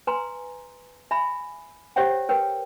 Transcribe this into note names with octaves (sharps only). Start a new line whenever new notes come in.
B4 G#5 A#5 C6
E5 G#5 B5
G4 C5 C#5 E5 F#5 G5
A#4 B4 C#5 G5